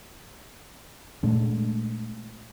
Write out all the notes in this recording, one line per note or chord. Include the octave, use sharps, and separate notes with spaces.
A#2 G#3 A3 D4